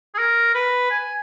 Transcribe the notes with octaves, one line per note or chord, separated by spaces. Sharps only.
G#4
A#4
B4
G#5